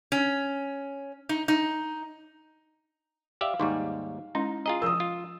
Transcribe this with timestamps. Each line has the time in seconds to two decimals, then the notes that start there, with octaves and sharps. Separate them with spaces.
0.12 C#4
1.29 D#4
1.48 D#4
3.41 G4 D5 E5 F5
3.60 D#2 G#2 G3 D#4 C#6 D6
4.35 G#3 C#4 D#4 E4
4.66 F4 G#4 D#5 A#5
4.82 F3 A#4 D#6 E6
5.00 F4